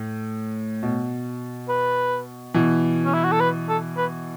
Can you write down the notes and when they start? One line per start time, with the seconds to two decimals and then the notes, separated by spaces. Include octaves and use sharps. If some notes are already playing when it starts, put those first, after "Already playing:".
Already playing: A2
0.83 B2
1.69 B4
2.54 B2 E3
3.05 C#4
3.14 E4
3.23 F#4
3.32 A4
3.40 B4
3.69 A4
3.97 B4